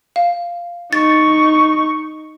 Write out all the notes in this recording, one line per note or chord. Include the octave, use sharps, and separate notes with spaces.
F5
D#4 C#6 A6